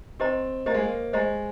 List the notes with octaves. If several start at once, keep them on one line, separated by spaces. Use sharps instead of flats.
C4 G4 C5 D#5 A#5
A#3 G4 C5 D#5 A#5
G#3
A#3
G#3 G4 C5 D#5 A#5